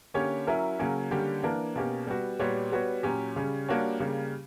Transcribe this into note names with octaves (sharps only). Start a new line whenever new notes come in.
D3 A#3 C#4 G4 C#5
F#3 C#4 E4 A#4 E5
C#3 F#3 A#3 C#4
D3 G3 A#3 C#4 G4
E3 A#3 D4 A#4
B2 A#3 C#4 G4
G3 B3 F#4
A#2 G3 B3 F#4 C#5
G3 B3 F#4 C#5
A#2 F#3 C#4 G4
C#3 G3 C#4
G3 A#3 D4 F#4 C#5
C#3 G3 A#3